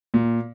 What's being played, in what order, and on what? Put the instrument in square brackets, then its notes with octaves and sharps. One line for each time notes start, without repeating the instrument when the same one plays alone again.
[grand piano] A#2